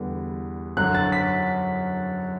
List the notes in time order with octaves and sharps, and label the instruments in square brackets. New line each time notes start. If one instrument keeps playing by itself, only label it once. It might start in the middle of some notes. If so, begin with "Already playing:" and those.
Already playing: [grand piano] E2 D3 G3 B3
F#2 D3 F#3 F#6
A6
B6